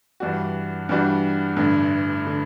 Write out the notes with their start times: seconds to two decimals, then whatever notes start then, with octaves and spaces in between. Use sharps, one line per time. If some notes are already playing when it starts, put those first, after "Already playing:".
0.20 G2 E3 G3 D4 F#4
0.89 G2 E3 G3 D4 F#4
1.56 A1 G2 D3
2.27 D3